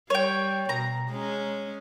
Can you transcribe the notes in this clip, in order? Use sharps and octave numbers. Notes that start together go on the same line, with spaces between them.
G3 C#5 G5
B2 A#5
G#3 C#4